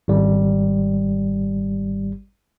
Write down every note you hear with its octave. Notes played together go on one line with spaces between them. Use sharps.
G#1 G3